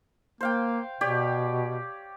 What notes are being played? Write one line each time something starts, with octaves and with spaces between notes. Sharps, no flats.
A#3 C5 F5 G5
B2 G4 C#5 D5